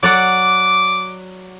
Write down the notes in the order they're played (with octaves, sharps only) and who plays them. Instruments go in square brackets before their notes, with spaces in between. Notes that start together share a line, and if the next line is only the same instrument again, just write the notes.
[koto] F#3 D5 F#5 [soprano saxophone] D6